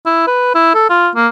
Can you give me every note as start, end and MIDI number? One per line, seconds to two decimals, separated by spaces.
0.06 0.26 64
0.27 0.52 71
0.55 0.73 64
0.75 0.85 69
0.90 1.10 65
1.16 1.28 58